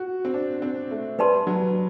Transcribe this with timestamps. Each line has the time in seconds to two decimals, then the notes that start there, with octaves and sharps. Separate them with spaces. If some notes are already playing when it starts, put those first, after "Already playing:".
Already playing: F#4
0.25 C4
0.34 D4
0.62 C4
0.91 A3
1.19 G3 B4 D5 A5 C6
1.47 F#3